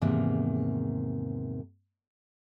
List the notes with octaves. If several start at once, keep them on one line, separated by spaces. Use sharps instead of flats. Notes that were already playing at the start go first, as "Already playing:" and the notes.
E2 G#2 C3 D#3 A#3